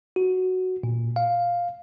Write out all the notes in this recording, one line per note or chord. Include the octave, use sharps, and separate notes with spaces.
F#4
A#2
F5